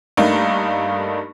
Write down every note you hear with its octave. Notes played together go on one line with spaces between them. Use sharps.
G2 A3 A#3 D4 D#4 F5